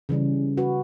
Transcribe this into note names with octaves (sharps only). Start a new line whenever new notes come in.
C#3 E3 G3 C#4
F#4 B4